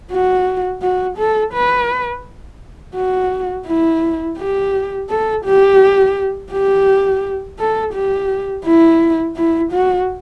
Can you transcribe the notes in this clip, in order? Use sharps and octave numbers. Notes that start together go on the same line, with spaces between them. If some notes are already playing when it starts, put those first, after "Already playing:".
F#4
F#4
A4
B4
F#4
E4
G4
A4
G4
G4
A4
G4
E4
E4
F#4